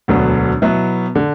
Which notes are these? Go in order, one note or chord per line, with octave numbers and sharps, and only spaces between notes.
E1 D2 D3 F#3 B3
B2 F#3 B3 E4
D3